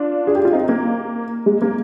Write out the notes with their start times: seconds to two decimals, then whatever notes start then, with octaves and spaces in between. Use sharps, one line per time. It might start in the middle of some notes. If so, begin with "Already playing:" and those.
Already playing: D4 F4
0.27 G#4
0.35 G4
0.45 F4
0.53 C4 D#4
0.69 A#3
1.46 G#3
1.62 A#3